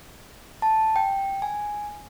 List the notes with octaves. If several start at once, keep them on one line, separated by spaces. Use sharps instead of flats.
A5
G5
G#5